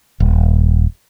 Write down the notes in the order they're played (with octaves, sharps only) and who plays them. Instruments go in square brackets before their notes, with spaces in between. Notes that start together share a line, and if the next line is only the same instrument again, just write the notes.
[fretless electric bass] D#1